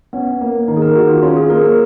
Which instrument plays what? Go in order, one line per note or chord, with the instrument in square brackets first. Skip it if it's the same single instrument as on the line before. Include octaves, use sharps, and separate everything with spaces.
[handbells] B3 [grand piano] C#4
[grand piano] A#3
[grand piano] D#3 [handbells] D#4
[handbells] G#4
A#4
[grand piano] D#3 [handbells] F#4
[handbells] F4
[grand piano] C#4 [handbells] F4
[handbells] G#4
[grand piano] A#3 [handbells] A#4
[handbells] A#4